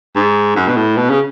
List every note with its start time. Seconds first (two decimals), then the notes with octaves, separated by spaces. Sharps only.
0.16 G#2
0.56 F#2
0.68 B2
0.76 A2
0.97 B2
1.10 C#3